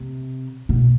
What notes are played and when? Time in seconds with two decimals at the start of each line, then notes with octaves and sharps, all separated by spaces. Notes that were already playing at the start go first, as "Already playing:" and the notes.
Already playing: C3
0.69 B2